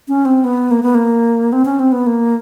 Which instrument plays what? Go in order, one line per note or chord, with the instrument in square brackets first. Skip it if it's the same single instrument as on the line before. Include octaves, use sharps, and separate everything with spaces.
[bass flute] C#4
C4
B3
A#3
B3
A#3
C4
C#4
C4
B3
A#3